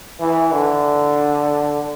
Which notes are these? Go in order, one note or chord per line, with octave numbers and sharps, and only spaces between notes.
E3
D3